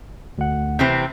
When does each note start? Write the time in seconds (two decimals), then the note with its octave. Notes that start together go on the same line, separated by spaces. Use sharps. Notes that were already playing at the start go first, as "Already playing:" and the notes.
0.38 D2 F#5
0.79 C3 E3 C4 G6